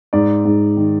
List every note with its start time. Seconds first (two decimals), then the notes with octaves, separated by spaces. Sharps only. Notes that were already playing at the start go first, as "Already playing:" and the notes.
0.13 G#2 D5
0.45 G#2
0.77 D#3